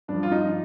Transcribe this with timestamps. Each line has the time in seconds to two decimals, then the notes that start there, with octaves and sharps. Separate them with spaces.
0.08 G2 F3 D4
0.23 F4
0.31 D#4